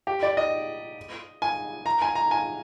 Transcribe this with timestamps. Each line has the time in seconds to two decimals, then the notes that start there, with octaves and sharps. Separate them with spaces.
0.07 G4
0.23 D5
0.37 D#5
1.42 G#5
1.86 A#5
2.02 G#5
2.15 A#5
2.31 G#5